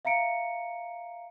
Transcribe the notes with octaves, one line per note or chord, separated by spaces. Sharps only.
E5 F5 A#5 C#7 D7